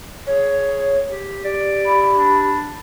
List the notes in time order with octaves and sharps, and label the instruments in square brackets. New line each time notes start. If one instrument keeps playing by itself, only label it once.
[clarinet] G#4 [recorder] C#5
[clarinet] G4
[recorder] G4 [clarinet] D5
[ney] B5
[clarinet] D4